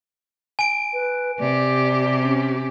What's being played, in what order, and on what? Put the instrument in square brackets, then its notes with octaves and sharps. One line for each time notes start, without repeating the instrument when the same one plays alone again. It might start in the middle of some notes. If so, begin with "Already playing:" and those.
[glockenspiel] G#5 D7
[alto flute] B4
[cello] C3 G4 [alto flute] D5
[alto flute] C#4